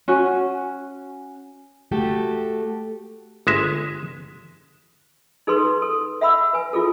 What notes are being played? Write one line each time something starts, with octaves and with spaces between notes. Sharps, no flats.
C#4 F#4 G#5
A3 F#4 G4 A4
G1 G#3 E5
D#4 G#4 A4 B4 C6
A4
E5 F#5 B5 E6
B4 G#5
E4 F4 G#4 A4